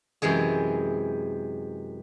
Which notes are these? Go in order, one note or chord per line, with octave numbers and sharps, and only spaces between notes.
F#2 C3 E3 G#3 G#4